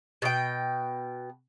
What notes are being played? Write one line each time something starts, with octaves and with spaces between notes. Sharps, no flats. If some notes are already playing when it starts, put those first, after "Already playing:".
B2 G5